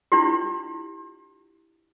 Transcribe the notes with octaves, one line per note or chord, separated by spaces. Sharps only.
D4 E4 F4 G4